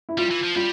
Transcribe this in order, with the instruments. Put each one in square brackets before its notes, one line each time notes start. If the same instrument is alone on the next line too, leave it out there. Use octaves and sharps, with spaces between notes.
[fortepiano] E4
[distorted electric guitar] G3 [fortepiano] F4
[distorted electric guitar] E3
F3
[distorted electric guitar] G3 [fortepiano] F4